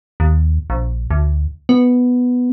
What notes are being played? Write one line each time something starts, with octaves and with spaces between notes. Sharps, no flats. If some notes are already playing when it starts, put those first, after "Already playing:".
D#2
A#1
D2
B3